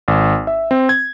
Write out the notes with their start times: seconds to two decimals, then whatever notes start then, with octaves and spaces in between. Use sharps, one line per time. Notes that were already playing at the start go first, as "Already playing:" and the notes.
0.08 G#1
0.47 E5
0.71 C4
0.89 G#6